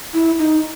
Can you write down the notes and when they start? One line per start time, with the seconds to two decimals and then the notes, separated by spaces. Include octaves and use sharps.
0.14 E4
0.39 D#4